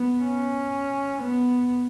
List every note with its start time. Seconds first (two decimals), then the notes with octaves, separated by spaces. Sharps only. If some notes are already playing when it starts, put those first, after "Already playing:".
Already playing: B3
0.23 C#4
1.22 B3